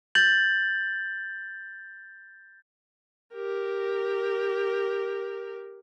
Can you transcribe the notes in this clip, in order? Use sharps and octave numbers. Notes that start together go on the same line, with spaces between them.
G6 A6 F#7
G4 A#4